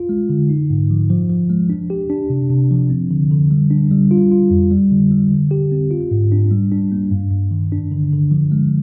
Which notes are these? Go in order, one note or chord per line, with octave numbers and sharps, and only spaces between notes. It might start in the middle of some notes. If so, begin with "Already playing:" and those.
Already playing: F4
G#3
D3
D#4
G#2
F3
F3
F3
G#3
D4
G4
D4
C3
C3
F3
C4
D3
D3
G3
D4
G3
F4
F4
F2
G3
D3
G3
D3
G4
C4
F4
G#2
D4
G3
D4
A#3
G2
G2
D#3
D4
D3
D3
F3
G#3